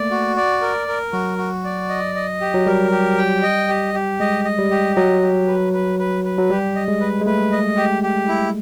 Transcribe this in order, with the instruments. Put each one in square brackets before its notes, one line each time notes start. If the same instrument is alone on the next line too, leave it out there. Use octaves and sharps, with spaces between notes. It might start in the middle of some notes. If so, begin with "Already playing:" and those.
Already playing: [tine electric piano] A3 A#3 [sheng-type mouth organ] D5
[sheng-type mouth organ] F#4
D5
A#4
A#4
[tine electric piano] F#3 [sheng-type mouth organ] F#4
[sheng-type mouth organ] F#4
D5
D#5
D#5
G4
[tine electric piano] F#3
[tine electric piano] G3 [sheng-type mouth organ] A#4
[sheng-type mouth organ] G4
G5
D#5
G4
G4
[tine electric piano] G#3 [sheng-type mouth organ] D#5
[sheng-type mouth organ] D#5
[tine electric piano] G3
[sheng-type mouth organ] G4
[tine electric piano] F#3 [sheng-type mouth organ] D#5
[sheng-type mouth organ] G4
B4
B4
B4
B4
[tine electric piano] F#3
[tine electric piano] G3 [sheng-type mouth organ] G4
[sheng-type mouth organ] D#5
[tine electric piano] G#3
[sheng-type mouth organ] B4
[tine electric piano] G#3
[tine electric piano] A3 [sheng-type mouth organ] B4
[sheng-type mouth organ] D#5
G4
G4
E4